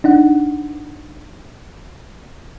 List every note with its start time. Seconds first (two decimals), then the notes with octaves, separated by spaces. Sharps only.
0.04 D4 D#4 F#5